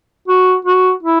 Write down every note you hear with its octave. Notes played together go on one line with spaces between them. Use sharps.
F#4
F#4
E4